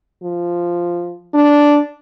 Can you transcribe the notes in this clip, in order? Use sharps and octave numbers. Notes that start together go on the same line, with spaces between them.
F3
D4